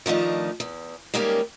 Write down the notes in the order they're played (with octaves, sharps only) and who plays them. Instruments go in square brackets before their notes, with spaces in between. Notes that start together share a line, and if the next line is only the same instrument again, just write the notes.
[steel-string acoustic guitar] D#3 F3 A3 D4 D#4
E2
D#3 G3 G#3 A#3 C#4 G4